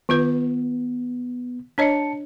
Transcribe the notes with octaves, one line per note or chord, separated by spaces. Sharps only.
D#3 B3 F4 B4
D4 C#5 D#5 A5 C#7